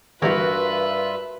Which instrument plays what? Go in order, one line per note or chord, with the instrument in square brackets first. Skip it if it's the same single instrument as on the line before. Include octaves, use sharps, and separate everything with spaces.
[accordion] G2 F4 E5 [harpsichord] E3 G3 [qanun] F#4 A#4 [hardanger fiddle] B4